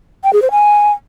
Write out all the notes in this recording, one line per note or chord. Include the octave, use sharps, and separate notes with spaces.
G5
G#4
C5
G#5